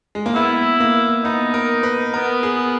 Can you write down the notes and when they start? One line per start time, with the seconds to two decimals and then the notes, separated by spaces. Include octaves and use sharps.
0.15 G#3
0.26 A#3
0.35 B3 E4
0.80 A#3
1.24 B3 D#4
1.54 A#4
1.83 B4
2.13 B3 A#4
2.43 G#4